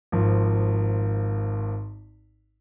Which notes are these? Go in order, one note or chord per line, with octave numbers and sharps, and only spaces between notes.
G#1 F3